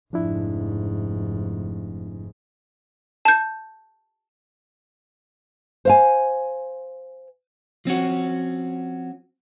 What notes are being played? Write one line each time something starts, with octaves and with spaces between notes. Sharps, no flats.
F1 G#2 F3 D4 E4
A5 G6
C5 F5 G#5
F3 C4 C#4 F#4